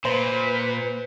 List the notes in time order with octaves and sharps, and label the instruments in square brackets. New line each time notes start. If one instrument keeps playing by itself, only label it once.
[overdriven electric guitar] A#2 [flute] B4 [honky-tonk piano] C5